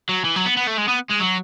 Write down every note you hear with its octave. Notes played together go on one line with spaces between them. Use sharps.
F#3
E3
F#3
B3
B3
A3
G#3
B3
G#3
F#3